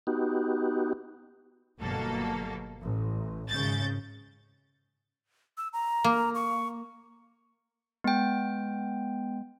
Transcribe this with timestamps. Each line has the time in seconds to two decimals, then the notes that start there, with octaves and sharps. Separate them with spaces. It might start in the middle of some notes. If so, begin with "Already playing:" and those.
0.07 B3 D#4 F#4 G4
1.80 G1 B2 F#3 A#3 A4
2.82 A1
3.49 G#1 C#3 G6 A6
5.58 E6
5.73 A#5
6.04 A#3
6.35 C#6
8.04 G#3 B3 G5